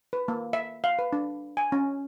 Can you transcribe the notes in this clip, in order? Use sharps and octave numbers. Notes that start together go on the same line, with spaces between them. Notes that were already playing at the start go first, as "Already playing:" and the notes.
B4
A#3
E5
F5
B4
D4
G#5
C#4